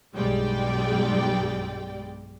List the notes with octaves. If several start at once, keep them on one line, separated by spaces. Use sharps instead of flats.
B1 G2 G3 G#3 D5 G5